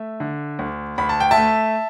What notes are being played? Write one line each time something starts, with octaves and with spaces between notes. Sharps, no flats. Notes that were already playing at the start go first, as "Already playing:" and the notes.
Already playing: A3 E5
D3
D2
D2 B5
A5
G5
E5 A5
A3